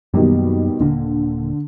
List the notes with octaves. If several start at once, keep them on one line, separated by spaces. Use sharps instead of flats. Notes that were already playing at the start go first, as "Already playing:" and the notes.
F#2 B2 D#3 F#3 G3 A#3
D#1 D3 A#3